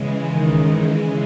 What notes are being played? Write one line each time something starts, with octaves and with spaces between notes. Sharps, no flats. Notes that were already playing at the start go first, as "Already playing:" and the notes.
Already playing: C#3 E3 G#3
D#3